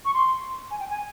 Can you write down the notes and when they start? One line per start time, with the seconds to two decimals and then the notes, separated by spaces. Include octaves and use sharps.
0.05 C#6
0.14 C6
0.70 G#5
0.79 G5
0.90 G#5